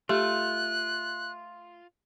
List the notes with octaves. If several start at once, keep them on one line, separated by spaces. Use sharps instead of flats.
A3 F4 G4 F#6